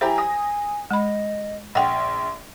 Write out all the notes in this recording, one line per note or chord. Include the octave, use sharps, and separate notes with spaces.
E4 G4 C5 G#5 A#5
D#6 A#6
G#3 D#5 B5
A#1 F#5 G5 C6